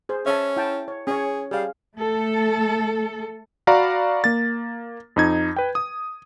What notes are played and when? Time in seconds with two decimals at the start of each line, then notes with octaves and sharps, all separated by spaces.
0.09 G#4 C5
0.26 C#4 E5 G#5 A5
0.57 E4 G5 A5
0.88 C#5
1.07 C#4 G#4 C#5
1.51 G3 G#4 F5
1.97 A3 A4
3.67 F#4 D5 F5 A#5 B5
4.24 A#3 A6
5.16 F2 D#4 G#6
5.56 B4 G5
5.75 D#6